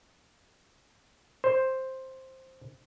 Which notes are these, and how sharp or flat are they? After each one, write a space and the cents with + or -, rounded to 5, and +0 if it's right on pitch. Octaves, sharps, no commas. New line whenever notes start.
C5 +5